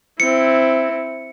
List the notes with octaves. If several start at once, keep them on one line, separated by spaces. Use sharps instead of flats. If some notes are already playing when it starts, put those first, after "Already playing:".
C4 E4 C#7